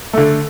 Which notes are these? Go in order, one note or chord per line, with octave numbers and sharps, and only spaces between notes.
D3 A3